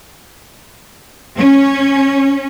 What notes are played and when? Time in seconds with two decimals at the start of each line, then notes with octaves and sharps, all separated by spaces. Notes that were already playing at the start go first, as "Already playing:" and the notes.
1.37 C#4